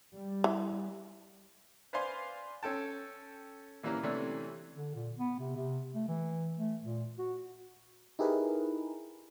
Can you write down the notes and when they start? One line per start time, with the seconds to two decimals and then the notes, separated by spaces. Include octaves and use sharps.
0.12 G3
0.44 E3
1.93 B4 C5 D5 F5 G#5 C6
2.63 C#4 A4 G5 A5
3.83 A#2 E3 G3 A#3 C#4
4.03 C3 E3 G3 A3 C#4 D4
4.74 D3
4.95 A#2
5.17 B3
5.39 C3
5.56 C3
5.94 A3
6.08 E3
6.56 A3
6.82 A#2
7.19 F#4
8.19 D#4 E4 G4 G#4 A#4 B4